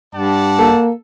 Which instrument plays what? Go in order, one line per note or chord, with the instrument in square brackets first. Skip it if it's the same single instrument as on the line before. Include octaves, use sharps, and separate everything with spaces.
[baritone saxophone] G2 [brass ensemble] D5 F#5 A5
[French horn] A#3 [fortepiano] A4